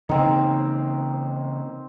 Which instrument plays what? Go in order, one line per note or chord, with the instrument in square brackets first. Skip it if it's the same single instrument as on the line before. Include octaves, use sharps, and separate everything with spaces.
[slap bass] C#3 E3 A#3 [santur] C4 D#4